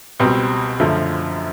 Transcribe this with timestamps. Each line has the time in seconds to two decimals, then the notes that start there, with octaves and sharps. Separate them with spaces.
0.20 C#2 B2 G3 C4
0.79 F#1 F#2 D3 F3 A3